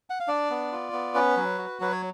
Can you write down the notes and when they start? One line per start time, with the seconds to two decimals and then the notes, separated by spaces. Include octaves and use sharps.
0.10 F#5
0.20 F5
0.28 D4 D5
0.50 B3
0.72 F4
0.93 B3
1.15 C#4 B4
1.37 F#3
1.58 F#4
1.81 F#3 B4
1.92 C#5